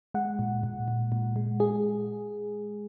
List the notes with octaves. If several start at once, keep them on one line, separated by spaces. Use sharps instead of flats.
G#3 F#5
A#2
A#2
A#2
A#2
G#3
G#3 G#4